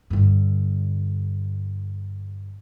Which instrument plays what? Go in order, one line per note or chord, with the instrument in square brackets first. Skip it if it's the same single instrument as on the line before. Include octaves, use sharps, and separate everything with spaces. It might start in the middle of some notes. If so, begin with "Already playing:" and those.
[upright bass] G2 D3